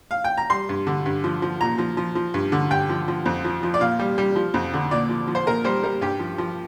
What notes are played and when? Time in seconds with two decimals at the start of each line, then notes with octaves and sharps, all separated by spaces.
0.11 F5
0.24 G5
0.37 A#5
0.50 G3 C6
0.69 G2
0.87 D3
1.06 G2
1.24 F3
1.42 F3
1.61 A#2 A#5
1.78 F3
1.97 F3
2.15 F3
2.34 G2
2.52 D3
2.71 G2 G5
2.89 F3
3.08 F3
3.26 F2
3.44 F3
3.63 F3
3.74 D5
3.80 A#2 F5
3.99 G3
4.18 G3
4.36 F3
4.54 F2
4.73 D3
4.91 A#2 D5
5.09 F3
5.27 F3
5.35 C5
5.46 A#2 A#4
5.64 G3 C5
5.83 G3 A#4
6.01 G2 G4
6.19 F3
6.38 F3